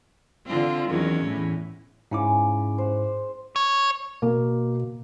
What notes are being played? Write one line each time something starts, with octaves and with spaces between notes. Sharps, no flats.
D3 C4 F4
E2 D#3 F#3 C#4
A2 E3
G#2 C#3 C#4 E4 D6
C5 F#5
C#5
B2 A#3